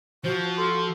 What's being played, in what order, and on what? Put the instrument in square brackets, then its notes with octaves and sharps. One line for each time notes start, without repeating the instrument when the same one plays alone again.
[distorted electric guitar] F3 [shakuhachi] F#4 [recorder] C5
[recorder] A4 [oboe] C6